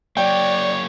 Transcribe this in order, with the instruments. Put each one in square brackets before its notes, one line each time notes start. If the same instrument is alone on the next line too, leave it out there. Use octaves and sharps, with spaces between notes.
[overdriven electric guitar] F#3 A#3 [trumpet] C#5 [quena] D5 [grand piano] G5